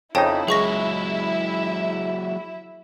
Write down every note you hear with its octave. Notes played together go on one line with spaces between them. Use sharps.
F2 C#3 D#4 E4 C#5 E5 G5 A5
C#2 F#3 G#3 G#4 C#6 A#6